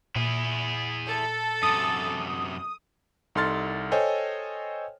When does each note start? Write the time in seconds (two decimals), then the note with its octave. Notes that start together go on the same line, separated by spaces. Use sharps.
0.16 A#2 E4 G#4
1.08 A4
1.63 F#2 C3 D#6
3.35 C2 D#4 A4 C6 F6 A6
3.92 A4 C5 C#5 D#5 G5 G#5